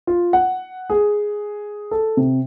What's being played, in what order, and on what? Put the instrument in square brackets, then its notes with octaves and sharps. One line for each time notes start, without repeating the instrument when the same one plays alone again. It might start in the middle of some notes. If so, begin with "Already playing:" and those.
[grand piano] F4
F#5
G#4
A4
C3